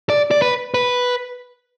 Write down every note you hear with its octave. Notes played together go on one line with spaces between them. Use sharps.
D5
D5
B4
B4